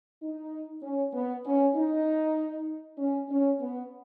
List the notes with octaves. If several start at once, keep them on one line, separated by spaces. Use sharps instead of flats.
D#4
C#4
B3
C#4
D#4
C#4
C#4
B3